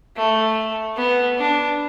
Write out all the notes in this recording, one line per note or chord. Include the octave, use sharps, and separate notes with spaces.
A3
B3
D4